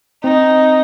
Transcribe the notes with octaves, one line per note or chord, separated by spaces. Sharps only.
C4 D#4